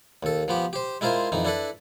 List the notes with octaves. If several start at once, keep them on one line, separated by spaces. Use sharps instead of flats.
D#2 A4
F3 B3 G4
G4 C5
G#3 E4 F4 A#4 C5
F2 E3 D#4
D4 E4 A4 B4